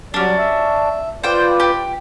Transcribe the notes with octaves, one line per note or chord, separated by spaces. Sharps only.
F#3 G3 C#4 D4 D5
E5
F4 B4 C5 D5 G5
G4